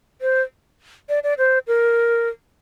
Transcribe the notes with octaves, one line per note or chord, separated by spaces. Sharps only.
C5
D5
D5
C5
A#4